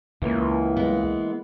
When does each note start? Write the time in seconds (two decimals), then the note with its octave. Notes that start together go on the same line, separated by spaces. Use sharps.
0.22 C#2 E3 A#3
0.77 G#3 B3